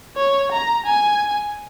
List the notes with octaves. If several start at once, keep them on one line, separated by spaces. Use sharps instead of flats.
C#5
A#5
G#5